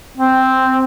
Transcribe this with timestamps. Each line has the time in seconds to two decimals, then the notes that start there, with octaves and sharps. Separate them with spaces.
0.18 C4